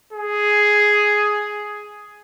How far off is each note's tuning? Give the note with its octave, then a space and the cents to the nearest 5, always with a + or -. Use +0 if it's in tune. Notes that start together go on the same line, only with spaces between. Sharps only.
G#4 +5